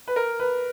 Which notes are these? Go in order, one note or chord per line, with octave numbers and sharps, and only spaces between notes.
B4
A#4
B4